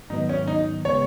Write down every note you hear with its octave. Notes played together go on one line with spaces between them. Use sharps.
G#2 D#3 F#3 B3 D#4
C#4
D#4
C#3 G#3 B3 C#5